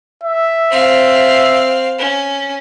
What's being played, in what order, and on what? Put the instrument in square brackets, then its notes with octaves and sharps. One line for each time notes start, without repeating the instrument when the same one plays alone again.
[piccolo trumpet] E5
[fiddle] C4 F5
C#4